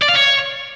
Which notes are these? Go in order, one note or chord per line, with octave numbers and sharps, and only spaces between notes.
D5
F5
C#5